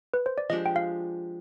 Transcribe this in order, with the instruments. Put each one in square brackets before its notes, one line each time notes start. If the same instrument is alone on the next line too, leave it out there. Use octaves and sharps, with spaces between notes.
[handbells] B4
C5
D5
[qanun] F3 G#3 D4 G4 [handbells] D#5
[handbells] G5
F5